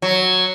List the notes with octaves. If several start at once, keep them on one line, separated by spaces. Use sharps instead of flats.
F#3